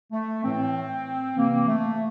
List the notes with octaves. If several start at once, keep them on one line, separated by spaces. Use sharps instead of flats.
A3
A2 E3 C4
C3 E3 A#3
A3